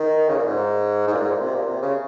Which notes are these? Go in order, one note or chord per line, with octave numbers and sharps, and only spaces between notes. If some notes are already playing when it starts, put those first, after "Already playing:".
Already playing: D#3
C#3
A#2
G#2
G#2
A#2
G#2
A#2
C3
A#2
C3
C#3